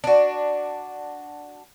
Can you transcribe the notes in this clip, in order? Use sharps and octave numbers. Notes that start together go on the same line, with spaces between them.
D4 F#4